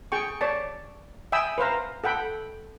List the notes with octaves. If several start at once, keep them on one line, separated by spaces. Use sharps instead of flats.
G#4 G5 C#6
C#5 D5 A5
E5 G5 G#5 B5 D#6 E6
B4 C5 F5 A#5
A4 F#5 G5 B5